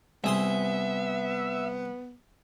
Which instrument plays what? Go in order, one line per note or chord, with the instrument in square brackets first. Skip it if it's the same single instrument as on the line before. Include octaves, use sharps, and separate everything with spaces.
[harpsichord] C2 G#4 C6 [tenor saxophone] B3 [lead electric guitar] E5